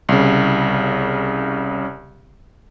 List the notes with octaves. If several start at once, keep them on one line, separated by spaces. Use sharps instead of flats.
C2 C#3